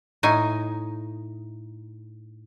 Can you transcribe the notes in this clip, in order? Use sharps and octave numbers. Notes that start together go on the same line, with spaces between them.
A2 D#4 G#5